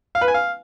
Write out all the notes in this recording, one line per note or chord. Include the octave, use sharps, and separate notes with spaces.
F5
B4
G#5
F5